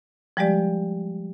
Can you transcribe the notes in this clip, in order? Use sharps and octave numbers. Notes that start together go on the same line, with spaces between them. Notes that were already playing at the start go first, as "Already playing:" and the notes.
F3 G3 G#3 G4 D5